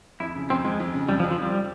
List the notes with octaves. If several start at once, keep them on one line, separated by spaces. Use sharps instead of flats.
F2 E4
C#3
F2 C4
F2 G#3
F2
C#3
F2 G3
F3
F2
F3
F2 G3